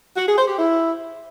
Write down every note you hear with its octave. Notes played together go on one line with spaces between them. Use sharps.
F#4
G#4
C5
G4
E4